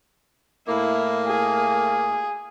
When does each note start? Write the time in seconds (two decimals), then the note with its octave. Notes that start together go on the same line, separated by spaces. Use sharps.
0.67 A2 A#3 E4
1.27 G#4